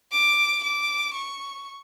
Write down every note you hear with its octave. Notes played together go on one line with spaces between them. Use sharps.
D6
D6
C#6